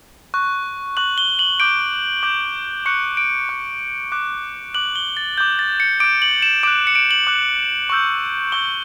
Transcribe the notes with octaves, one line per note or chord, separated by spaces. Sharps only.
C#6 F#6
C#6 F#6 F#7
G7
F#7
D6 G6 D7
D6 G6
C#6 F#6 C#7
D7
C#6 F#6
D6 F#6
D6 F#6 F#7
G7
A6
D6 G6
A6
C#7
D6 G6 D7
F#7
E7
D6 F#6 D7
C#7
D7
F#7
D6 F#6
C#6 E6 G6
C#6 E6 G6 G7